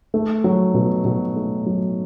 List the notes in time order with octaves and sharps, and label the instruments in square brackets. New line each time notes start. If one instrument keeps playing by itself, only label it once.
[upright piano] A3
F#3
B2
B2
A3
F#3